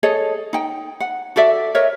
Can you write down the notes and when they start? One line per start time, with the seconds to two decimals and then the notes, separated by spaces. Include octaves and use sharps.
0.03 G#4 A4 C#5 D#5
0.53 D#4 G5
1.00 F#5
1.36 F#4 A4 D5 E5
1.75 A#4 C#5 D#5 E5